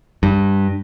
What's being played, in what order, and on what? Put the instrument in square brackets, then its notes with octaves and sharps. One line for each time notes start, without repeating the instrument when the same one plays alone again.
[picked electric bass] G2